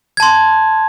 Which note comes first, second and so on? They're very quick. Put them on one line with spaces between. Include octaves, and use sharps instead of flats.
G#6 A5 C6